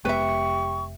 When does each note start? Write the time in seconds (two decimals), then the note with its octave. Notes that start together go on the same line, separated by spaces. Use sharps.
0.05 F1 G#3 B3 G4 B4 E5 C#6